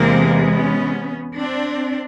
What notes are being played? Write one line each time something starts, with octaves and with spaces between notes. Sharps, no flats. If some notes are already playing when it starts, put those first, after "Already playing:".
Already playing: E2 C3 E3 G#3 A#3 C4
B3 C#4
C4 D4